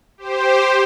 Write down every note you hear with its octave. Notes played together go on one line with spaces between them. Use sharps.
G4 C5